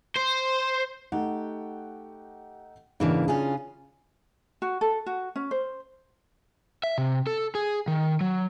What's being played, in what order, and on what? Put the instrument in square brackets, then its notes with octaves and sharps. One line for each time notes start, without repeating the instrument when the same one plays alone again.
[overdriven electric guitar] C5
[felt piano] A3 D#4 F#5 [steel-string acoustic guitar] G4
[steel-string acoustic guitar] G#2 E3 A#3 [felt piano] C#3 D4
[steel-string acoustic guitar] C#4 F4 G#4
[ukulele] F#4
A4
F#4
C#4
C5
[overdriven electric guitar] E5
C3
A4
G#4
D#3
F#3